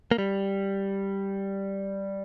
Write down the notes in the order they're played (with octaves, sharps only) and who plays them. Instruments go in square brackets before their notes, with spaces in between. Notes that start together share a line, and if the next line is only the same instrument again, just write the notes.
[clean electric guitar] A#3
G3